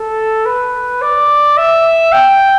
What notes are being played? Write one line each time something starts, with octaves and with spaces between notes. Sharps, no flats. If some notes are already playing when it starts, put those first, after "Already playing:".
Already playing: A4
B4
D5
E5
G5